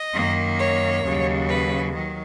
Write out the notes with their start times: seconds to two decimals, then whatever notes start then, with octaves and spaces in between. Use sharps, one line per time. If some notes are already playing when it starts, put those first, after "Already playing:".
Already playing: D#5
0.13 F#2 D#3 A#3
0.58 C#5
1.03 D#2 C#3 F#3
1.48 B4
1.93 D#3 F#3